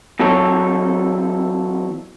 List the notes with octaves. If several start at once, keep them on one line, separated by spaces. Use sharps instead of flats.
E2 F#3 C4 A4 C#5